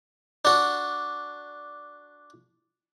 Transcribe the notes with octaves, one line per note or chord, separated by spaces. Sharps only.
D4 F#4